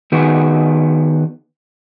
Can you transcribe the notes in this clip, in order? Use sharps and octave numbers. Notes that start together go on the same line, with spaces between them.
D#3 B3 F#4 G#4